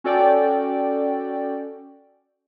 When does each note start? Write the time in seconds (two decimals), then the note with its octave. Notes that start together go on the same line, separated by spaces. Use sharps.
0.04 C#4 F#4 A4 D5 G5